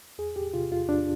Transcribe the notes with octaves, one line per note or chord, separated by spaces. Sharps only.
E2 G#4
E2 G4
C3 F4
E2 F4
E2 D4